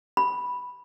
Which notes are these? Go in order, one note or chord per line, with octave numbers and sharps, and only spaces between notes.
B5